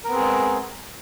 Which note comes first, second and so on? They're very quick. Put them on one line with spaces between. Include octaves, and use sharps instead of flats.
A#4 B3 C4 G#4 G#3